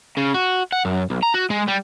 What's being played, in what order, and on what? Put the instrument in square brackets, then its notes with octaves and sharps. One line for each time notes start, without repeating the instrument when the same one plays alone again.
[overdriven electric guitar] C#3
F#4
F#5
F#2
B1
A#5
F#4
G#3
G3